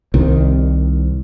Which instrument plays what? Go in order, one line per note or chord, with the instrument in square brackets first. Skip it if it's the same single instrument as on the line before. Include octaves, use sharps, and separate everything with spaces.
[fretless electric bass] C2 C3 D#3